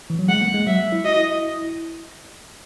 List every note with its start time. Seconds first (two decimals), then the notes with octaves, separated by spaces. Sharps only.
0.10 E3
0.19 F#3
0.29 G#3 F#5
0.41 A#3
0.54 G#3
0.66 F#3 E5
0.92 E4
1.04 F#4 D#5
1.16 E4